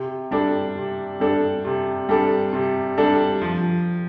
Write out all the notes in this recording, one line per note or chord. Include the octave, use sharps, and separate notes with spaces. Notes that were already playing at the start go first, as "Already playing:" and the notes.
Already playing: C3
G3 D4 A4
C3
G3 D4 A4
C3
G3 D4 A4
C3
G3 D4 A4
F3